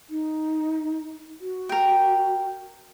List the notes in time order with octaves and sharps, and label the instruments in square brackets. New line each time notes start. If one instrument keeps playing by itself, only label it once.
[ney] D#4
F#4
[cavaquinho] A#4 G5